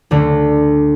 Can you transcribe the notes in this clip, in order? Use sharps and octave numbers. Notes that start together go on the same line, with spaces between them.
D2 D3